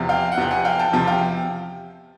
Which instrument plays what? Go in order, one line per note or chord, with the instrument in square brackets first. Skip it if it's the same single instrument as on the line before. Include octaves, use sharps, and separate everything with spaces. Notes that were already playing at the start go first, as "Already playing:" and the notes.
Already playing: [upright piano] E2 C3 F3
F5 G5
F#5
E2 C3 F3 G5
F#5 G#5
F5 G5
G5 A5
E2 C3 F3 G5 A5
F5 G5